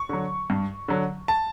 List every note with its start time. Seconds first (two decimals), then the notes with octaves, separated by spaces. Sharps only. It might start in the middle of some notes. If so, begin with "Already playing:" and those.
Already playing: C#6
0.09 D3 F#3
0.50 G2
0.88 D3 F#3
1.28 A5